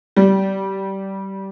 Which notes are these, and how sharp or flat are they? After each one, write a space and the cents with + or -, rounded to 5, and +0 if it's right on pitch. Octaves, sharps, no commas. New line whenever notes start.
G3 -20